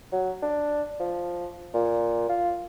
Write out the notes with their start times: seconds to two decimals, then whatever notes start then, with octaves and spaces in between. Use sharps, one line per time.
0.13 F#3
0.42 D4
1.00 F3
1.74 A#2
2.29 F4